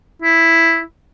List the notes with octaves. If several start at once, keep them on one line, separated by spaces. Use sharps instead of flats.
E4